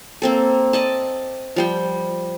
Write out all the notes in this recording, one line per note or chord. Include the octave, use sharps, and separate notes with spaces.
A#3 C4 A4
D5 D#5 A5
F3 G3 G5